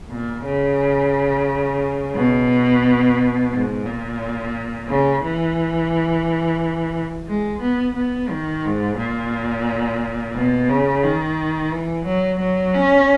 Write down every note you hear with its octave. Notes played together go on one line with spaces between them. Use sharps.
A#2
C#3
B2
G#2
A#2
C#3
E3
G#3
B3
B3
D#3
G#2
A#2
B2
C#3
D#3
E3
F#3
F#3
C#4